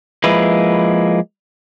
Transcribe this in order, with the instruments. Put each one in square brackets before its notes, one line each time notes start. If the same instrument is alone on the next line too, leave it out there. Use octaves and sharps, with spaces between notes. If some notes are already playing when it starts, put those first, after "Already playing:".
[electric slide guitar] F3 G#3 A#3 E4 B4